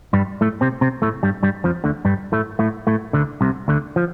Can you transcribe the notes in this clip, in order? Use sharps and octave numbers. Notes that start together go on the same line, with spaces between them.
G2 G3
A2 A3
C3 C4
C3 C4
A2 A3
G2 G3
G2 G3
F2 F3
D2 D3
G2 G3
A2 A3
A2 A3
A2 A3
D2 D3
C2 C3
D2 D3
F3